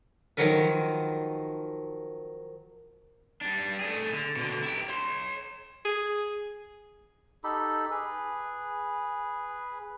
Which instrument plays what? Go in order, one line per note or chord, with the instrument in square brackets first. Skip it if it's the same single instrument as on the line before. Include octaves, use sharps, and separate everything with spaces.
[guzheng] D#3 F3 F#3 F#4 A#4 B4
[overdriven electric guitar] G3 D4
A3 G#4
D3
B2 D3
E4 G4
C#5 C6
[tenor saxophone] G#4
[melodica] D#4 G4 A4 B5
G#4 B4